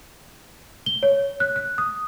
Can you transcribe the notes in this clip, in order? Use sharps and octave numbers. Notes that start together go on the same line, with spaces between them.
G7
C#5
F#6
F#6
D#6